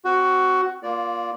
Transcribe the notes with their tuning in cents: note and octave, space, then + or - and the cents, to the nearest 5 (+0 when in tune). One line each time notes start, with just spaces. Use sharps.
C4 +5 F#4 +10
A#3 +25 F4 +0 D5 -15